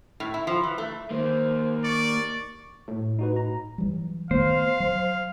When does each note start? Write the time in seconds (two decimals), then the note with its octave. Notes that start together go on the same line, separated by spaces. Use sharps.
0.20 A2
0.34 E4
0.47 F3
0.64 E3
0.78 A3
1.11 D#3 A#3 C5
1.84 D5 C#6
2.88 A2
3.19 D#4 F#4 B4
3.36 A#5
3.78 E3 F#3 G3
4.31 D#3 A3 B3 C5 F5
4.80 F#3